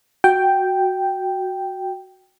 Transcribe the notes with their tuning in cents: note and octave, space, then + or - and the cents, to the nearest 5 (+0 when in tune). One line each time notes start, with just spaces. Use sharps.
F#4 +0 G5 +0